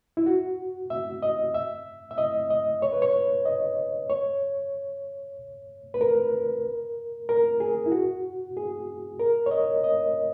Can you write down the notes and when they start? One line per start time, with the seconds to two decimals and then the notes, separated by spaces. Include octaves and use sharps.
0.17 E4
0.26 F#4
0.90 E5
1.22 D#5
1.54 E5
2.11 E5
2.18 D#5
2.50 D#5
2.82 C#5
2.92 B4
3.02 C#5
3.45 D#5
4.10 C#5
5.94 B4
6.01 A#4
7.29 A#4
7.60 G#4
7.86 E4
7.92 F#4
8.57 G#4
9.20 A#4
9.46 C#5
9.51 D#5
9.84 D#5